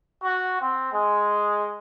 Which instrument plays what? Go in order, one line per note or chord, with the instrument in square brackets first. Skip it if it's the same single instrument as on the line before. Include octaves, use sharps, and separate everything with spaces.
[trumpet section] F#4
C4
G#3